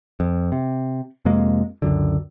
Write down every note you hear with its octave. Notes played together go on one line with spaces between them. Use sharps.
F2
C3
F2 C3 G#3 A#3
C#2 F#2 D3